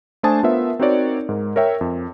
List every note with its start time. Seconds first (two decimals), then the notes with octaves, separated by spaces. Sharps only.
0.23 A3 D4 C5 G#5 A5 D#6
0.43 B3 F4 A#4 C5 E5
0.80 C4 D#4 F#4 A#4 C#5 D5
1.29 G#2 A#4
1.56 A#4 C#5 E5 G5
1.81 F2